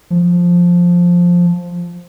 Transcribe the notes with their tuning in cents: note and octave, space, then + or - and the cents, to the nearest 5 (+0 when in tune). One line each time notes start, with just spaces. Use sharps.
F3 +5